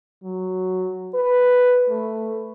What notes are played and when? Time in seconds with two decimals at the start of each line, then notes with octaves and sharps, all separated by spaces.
0.24 F#3
1.14 B4
1.89 A3